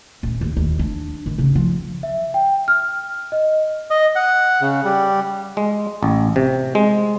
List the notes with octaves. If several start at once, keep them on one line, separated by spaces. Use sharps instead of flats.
D#1
D#2
D#2
D4
D#3
C#3
F3
E5
G5
F6
D#5
D#5
F#5
C#3
G3
G#3
A1
C3
G#3